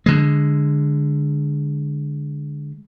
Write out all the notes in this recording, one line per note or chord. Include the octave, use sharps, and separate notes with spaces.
D3 G#3